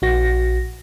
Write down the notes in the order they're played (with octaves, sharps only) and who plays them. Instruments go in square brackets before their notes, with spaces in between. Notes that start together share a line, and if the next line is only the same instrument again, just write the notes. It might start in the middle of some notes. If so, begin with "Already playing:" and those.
[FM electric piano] A#1 F#4 A#6